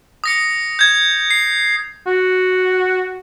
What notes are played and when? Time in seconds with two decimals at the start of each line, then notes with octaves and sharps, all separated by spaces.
0.24 D#6 A#6 C#7
0.79 G6 G#6
1.30 C7
2.07 F#4